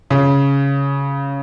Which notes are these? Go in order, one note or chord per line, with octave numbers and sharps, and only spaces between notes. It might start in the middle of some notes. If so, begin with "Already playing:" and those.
C#3